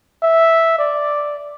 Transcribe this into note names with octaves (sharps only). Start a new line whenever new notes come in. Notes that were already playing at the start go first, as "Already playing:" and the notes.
E5
D5